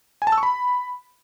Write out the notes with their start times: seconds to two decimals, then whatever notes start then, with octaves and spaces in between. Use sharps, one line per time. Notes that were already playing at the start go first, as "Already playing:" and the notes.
0.22 G#5
0.27 A5
0.32 E6
0.38 C#6
0.43 B5